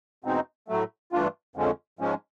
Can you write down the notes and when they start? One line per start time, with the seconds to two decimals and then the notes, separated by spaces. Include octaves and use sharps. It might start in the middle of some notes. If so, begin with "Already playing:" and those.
0.24 E2 B2 G#3 C4 D#4
0.68 A2 F#3 A3
1.12 G2 E3 A3 D4 F4
1.56 F2 D3 F3 G#3 C#4
1.99 G#2 F3 G#3 C#4